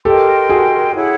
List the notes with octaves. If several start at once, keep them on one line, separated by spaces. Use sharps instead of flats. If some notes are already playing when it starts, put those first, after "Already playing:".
G4 A4 A#4 D#5 G5 C6
F#4 G#4
E4 G#4 C#5 F#5